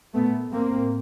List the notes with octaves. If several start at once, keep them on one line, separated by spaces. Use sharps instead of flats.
A#2 A3 B3
A2 A#3 C4